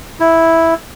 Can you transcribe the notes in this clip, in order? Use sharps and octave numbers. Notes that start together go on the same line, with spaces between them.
E4